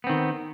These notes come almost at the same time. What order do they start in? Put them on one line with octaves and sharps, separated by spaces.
B3 C4 D#3